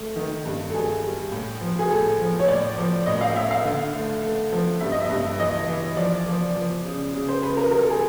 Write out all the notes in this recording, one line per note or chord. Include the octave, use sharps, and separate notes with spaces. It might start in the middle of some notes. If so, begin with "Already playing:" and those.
Already playing: A3
D#3
G2
A4
G2 G#4
G3
A2
F3
G#4
A2 A4
F3
C#5
A2 D5
F3
A2 D#5
F5
A2 E5
F5
D3
A3
A3
F3
G2 E5
D#5
E5
G2
E3 D#5
E3
F3 D5
F3
F3
C#3
C#3
C5
C#3 B4
A#4
G3 A#4
A4
G#4